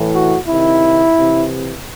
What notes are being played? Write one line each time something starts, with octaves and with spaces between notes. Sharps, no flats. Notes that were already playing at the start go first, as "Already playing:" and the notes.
Already playing: A2 E3
F#4
C3 D#3 E4
C3 E3